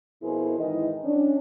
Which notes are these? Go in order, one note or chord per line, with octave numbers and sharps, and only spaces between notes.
F2 B2 E4 G#4 A#4 C5
G#2 D#3 E3 E4 D#5
C#4 D4